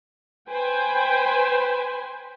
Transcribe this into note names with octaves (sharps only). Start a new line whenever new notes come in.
B4 C5 G5 G#5